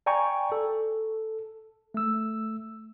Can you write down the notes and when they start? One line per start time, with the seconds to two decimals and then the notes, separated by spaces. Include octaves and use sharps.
0.06 D5 G5 G#5 A#5 C#6
0.52 A4
1.94 A3 E6